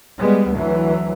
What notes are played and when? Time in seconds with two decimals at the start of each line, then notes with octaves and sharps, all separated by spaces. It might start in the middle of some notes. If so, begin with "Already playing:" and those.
0.21 G3 G#3 B3
0.54 D2 E3 F#3